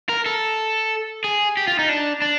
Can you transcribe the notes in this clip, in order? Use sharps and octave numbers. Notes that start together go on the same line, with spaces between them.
A#4
A4
G#4
G4
F4
D#4
D4
D4